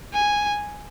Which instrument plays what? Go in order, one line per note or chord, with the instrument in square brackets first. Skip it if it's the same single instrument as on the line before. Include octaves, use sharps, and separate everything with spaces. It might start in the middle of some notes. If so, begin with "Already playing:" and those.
[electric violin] G#5